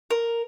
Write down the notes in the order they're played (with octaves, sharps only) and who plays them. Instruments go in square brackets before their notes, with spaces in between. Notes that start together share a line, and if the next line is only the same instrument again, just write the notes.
[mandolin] A#4